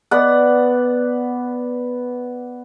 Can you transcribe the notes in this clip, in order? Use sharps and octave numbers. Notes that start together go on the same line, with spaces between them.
B3 B4 D5 F#5